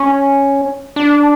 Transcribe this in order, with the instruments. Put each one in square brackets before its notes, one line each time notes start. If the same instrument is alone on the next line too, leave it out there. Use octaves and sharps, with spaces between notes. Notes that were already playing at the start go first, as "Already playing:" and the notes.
Already playing: [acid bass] C#4
D4